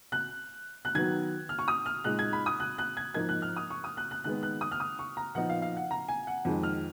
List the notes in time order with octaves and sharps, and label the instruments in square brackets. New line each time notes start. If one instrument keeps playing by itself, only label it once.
[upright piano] F#6
F#6
D#3 F#3 B3 G#6
F6
C#6
D#6
F6
A#2 G#3 D#4 F#6
G#6
B5
D#6
F#6
F#6
G#6
G#2 F3 A#3 D#4 G#6
F#6
F6
D#6
C#6
D#6
F#6
F#6
D#3 G#3 B3 F#6
F#6
D#6
F6
D#6
C#6
A#5
A#2 F3 B3 D#4 F#5
F5
F5
F#5
A#5
G#5
F#5
F2 D#3 G#3
F6